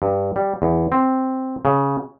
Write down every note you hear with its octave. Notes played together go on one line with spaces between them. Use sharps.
G2
G3
E2
C4
C#3